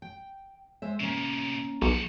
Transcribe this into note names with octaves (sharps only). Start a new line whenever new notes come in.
G5
G#3 C5 E5
A2 C3 A#3 C#4
B1 F3 F#4